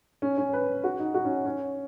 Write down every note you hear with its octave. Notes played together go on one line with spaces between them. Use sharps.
C#4
C#4
B4
F#4
D#4
F#4
C#4
C#4